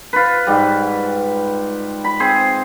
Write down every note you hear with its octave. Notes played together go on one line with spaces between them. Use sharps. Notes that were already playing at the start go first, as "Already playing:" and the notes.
F4 B4
G#2 G3
B5
C4 G#4 C5